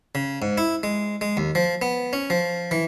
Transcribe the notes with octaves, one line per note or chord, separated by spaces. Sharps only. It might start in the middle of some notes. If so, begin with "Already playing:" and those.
C#3
G#2
E4
G#3
G#3
D#2
F3
B3
C#4
F3
E3